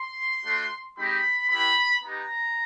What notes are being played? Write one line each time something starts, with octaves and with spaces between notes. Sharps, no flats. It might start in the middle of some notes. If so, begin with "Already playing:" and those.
Already playing: C6
A3 D4 F#4
G#3 C4 D#4 G4 B5
B3 E4 G4 B5
B3 D#4 G4 A#5